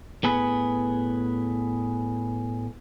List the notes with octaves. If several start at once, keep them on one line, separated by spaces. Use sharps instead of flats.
A2 B3 G#4 B4